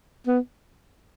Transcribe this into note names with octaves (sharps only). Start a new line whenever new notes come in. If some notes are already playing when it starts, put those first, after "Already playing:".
B3